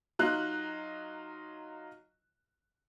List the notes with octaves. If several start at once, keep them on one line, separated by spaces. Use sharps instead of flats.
F#3 D#4 F4 F#6